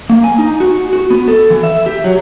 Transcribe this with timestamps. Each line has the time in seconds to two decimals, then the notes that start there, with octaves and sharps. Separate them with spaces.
0.10 A#3
0.24 G#5
0.39 D#4
0.60 F#4
0.93 F#4
1.10 B3
1.28 A4
1.50 E3
1.63 E5
1.86 G4
2.04 F#3